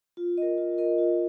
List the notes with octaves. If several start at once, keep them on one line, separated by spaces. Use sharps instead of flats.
F4
A#4 D#5
F4
A#4 D#5
F4